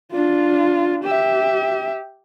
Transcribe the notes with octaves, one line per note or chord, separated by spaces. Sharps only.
D4 F4
G4 E5